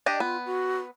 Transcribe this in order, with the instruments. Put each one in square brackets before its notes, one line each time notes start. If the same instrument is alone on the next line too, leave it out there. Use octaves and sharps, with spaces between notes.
[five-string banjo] D4 G4 D#5
[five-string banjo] B3 [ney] F4
[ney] F#4